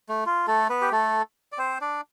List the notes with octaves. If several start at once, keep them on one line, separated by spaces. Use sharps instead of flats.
A3
F4
A3 A4
B3 B4
G4
A3 A4
D5
C4 C5
D4 D5